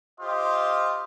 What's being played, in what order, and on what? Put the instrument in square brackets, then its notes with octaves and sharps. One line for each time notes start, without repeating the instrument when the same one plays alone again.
[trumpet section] F4 G4 C5 D#5